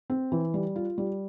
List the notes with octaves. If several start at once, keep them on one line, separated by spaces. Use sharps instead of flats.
C4
E3
G3
F4
G3